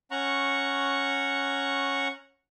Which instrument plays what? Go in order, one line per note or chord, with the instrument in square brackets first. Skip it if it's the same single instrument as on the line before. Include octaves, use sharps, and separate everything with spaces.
[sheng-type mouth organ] C#4 F#5 A#5 C#6